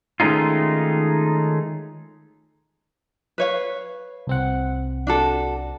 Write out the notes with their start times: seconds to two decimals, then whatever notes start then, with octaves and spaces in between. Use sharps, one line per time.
0.20 D#3 G#3 A3 C#4 D#4 F4
3.38 B4 C#5 F5
4.27 C2 C4 F#5
5.07 D4 F#4 A4